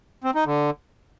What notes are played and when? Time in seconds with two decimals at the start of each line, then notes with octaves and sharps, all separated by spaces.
0.24 C4
0.35 D#4
0.46 D3